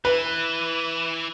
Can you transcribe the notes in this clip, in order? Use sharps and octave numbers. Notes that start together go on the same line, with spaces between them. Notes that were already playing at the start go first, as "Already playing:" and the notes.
E3 B4